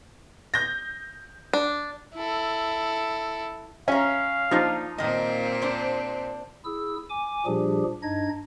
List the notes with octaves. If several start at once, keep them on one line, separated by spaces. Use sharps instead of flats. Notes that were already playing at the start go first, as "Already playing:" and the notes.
G6 A#6
D4
E4 A4
C#4 E5 F5 A#5
F3 A#3 D4 D#4 F4
A#2 D#3 A#3 C4 D#5
D4 C5
E4 G#4 E6
G#5 D6
A#2 F3 G3 D4 G4 G#4
G2 D4 D#4 D#5 G#6